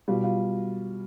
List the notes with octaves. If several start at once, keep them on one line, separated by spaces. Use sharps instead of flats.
B2 G3 F4
F4